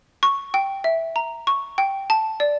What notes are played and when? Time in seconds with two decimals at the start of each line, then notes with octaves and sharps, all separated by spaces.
0.23 C#6
0.54 G5
0.84 E5
1.16 A#5
1.47 C#6
1.78 G5
2.10 A5
2.40 D5